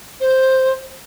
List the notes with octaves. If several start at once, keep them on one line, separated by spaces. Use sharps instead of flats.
C5